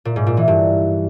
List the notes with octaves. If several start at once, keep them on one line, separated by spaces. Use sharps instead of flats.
A#2
G#2
A#2
E3
G2